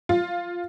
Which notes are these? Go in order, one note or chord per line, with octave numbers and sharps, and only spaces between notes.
F4